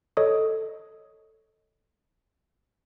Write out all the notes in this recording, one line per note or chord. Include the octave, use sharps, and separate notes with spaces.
A4 C#5 D#5 D#6